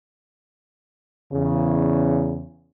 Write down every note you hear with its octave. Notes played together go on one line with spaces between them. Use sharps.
E2 C#3